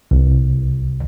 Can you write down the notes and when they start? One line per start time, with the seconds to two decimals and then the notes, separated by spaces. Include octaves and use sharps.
0.11 C2